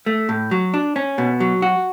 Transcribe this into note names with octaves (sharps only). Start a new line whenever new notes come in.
A3
A2
F#3
D4
C#4
B2
F#3
F#4